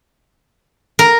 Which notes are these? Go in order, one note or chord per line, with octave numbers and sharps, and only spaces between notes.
A#4